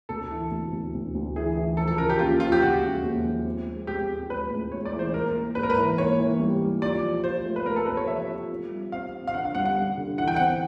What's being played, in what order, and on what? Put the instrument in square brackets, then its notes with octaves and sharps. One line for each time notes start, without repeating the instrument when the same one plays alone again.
[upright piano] D2 [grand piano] A4
[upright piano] E3
D2
D2
D2
D2
[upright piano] E3 [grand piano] G#4
[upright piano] E3
[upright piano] F3 [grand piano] A4
[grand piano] A4
[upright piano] C#3 [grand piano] A#4
[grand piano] G4
[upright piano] D#2 [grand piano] F4
[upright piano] F3 [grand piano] F4
[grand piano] G4
[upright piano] C#3 [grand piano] F#4
[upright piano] G#3
D#2
F3
C4
G#3
[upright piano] G#3 [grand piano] G4
[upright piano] C4
[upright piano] G#3 [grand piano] B4
[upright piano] A2
[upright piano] G#3 [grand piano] C#5
[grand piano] D5
[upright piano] E3
[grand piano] C5
[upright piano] A#3 [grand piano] A#4
[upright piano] A#3
[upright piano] G#2 [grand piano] B4
[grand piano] A#4
B4
[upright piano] E3
[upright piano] A#3 [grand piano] C#5
[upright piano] E3
G3
G3
[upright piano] F4 [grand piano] D5
[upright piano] F3
[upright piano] F4 [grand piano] C5
[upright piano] A3
[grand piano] B4
[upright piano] A3 [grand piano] A#4
[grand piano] A4
[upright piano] C4 [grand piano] B4
[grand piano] C#5
[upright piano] F3 [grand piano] E5
[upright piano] F4
C4
G3
[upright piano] C4 [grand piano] F5
[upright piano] C4
[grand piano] F5
[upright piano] D3 [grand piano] F#5
[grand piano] F5
[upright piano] G3 [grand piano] F#5
[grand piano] F#5
[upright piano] G3
D3
[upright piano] E3 [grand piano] F#5
[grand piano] G5
F#5
[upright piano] C4